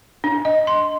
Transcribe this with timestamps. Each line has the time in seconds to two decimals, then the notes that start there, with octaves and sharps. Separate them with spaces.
0.24 D4
0.45 D#5
0.67 C6